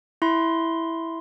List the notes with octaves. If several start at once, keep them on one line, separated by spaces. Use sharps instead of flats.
E4 C6